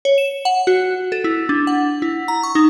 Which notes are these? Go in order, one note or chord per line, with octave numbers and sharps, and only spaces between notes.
C#5
E7
F#5
F#4
A4
E4
D4
F#5
E4
A#5
C#6
D#4